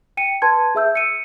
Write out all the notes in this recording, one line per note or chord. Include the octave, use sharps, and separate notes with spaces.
G5 C#7 D#7
B4 A5 C6 G#6
G#4 E5 E6 G6
C#7 D#7